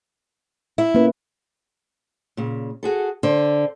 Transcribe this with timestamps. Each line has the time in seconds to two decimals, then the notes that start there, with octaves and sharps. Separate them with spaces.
0.78 E4 E5
0.95 A#3 C#4 B4
2.37 A#2 C#3
2.83 F#4 G#4 A4
3.23 D3 C5 D5